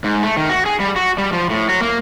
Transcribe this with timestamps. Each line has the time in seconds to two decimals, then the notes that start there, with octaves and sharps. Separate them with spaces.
0.04 G#2
0.23 A3
0.37 D#3
0.50 F#4
0.66 G#4
0.80 G3
0.96 F#4
1.18 G3
1.33 F3
1.50 A2
1.69 F#3
1.81 A#3